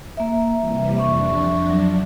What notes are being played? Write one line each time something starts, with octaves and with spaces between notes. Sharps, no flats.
A#3 E5
C3 E3 G3
F2 D4 E5 C#6
F#3